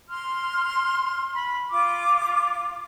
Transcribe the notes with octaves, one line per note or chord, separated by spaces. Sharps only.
C6 F6
B5
F4 D6